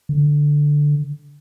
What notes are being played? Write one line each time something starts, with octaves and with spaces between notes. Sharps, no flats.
D3